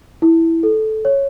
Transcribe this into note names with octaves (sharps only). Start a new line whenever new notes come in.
E4
A4
C#5